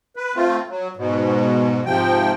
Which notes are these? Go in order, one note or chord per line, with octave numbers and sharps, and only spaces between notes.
B4
A3 C4 F4
F#3
G#2 B2
G#2 C3 F3 G5